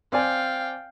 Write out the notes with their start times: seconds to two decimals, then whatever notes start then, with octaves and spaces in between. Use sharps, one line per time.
0.13 C4 D5 F5 G5 G#5